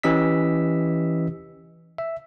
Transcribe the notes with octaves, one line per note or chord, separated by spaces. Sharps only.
E3 C#4 G4 D#5 E6 B6
E5